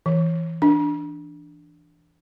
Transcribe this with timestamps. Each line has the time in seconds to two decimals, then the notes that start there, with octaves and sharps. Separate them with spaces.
0.06 E3
0.62 D4